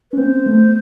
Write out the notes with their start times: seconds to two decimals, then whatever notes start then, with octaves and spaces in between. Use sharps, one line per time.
0.11 C#4 B4
0.17 A#3 C4 C5
0.46 A3 B3